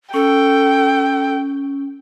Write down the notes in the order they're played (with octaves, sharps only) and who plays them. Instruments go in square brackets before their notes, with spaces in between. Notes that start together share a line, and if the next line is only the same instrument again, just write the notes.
[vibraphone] C#4 [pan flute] A4 [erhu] G5